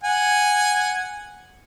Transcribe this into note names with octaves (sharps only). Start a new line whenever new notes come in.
F#5 G#5